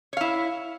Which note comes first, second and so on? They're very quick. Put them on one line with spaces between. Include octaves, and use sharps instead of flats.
C#5 F5 E4